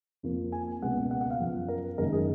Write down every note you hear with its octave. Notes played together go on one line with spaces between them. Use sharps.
F2 F3 A#3
G#5
C#2 B2 A#3 F#5
F#5
F#5
F5
F#2 F3 B3
A#4
F#1 F#2 D#3 G#3 A#4
G#4